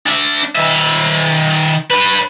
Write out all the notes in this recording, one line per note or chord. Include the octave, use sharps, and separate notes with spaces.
D4 E5
D#3 E5
D4 B4